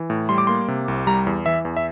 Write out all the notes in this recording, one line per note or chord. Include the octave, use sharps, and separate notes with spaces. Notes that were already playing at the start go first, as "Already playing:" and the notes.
Already playing: E3
A2
G3 C6
D6
A#3 C6
C3
C2
G3 A#5
E2
E3 E5
E2
E5